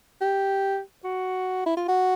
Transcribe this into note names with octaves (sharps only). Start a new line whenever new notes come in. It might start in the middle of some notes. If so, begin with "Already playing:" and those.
G4
F#4
E4
F4
F#4